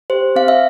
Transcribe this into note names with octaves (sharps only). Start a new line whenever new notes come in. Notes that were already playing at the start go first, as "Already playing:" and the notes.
G4 C5
C4 F5
E5